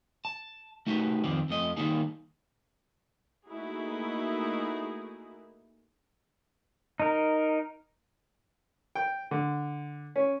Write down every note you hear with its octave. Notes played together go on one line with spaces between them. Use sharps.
A5
A3 D#4 F#4 G4 B4
F2 D#3 C4 D5
F2 A3 D#5
D#3 F#3 G3 A#3 D#4 G#4
A3 A#3 D#4 E4 F#4 G#4
D#4 A#4
G5
D3
C#4